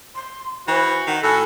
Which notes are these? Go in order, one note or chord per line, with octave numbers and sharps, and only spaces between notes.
C6
E3 F#4 C5
D#3 F#5
A2 F#4 A4 G#5